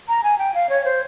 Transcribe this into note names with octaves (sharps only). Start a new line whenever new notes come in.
A#5
G#5
G5
F5
C#5
C5